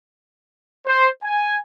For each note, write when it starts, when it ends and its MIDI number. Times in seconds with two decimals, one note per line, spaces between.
0.87 1.10 72
1.24 1.58 80